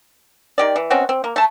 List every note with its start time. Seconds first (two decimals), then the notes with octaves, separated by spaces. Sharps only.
0.58 D#3 G4 D5
0.76 E3
0.90 B2 C4 C#4 F#4
1.09 C4
1.24 A#3
1.36 A3 A5